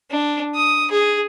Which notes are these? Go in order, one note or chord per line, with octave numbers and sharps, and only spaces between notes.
D4
D#6
G#4